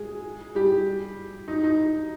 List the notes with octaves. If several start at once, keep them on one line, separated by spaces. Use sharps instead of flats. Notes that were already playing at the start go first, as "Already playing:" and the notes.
Already playing: G#3 G#4
G3 G4
D#4
D#4